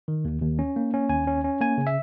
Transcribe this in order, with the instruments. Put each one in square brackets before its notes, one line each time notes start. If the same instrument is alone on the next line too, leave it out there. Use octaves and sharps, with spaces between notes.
[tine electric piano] D#3
D#2
D#2
C#4
A#3
C#4
D#2 G#5
C#4
C#4
A#3 G#5
C#3
E5